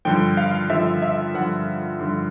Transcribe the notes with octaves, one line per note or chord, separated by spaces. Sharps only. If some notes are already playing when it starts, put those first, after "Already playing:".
G2 D3 F3 G5
F5
G2 D3 F3 E5
E5
G2 D3 F3 F#5
G2 D3 F3